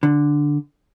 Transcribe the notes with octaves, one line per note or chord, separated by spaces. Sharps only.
D3